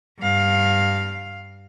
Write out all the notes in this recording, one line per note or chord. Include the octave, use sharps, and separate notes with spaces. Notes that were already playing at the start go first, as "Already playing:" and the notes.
G2 F5